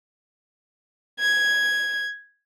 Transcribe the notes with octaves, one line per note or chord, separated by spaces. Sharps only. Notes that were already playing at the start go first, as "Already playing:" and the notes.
G#6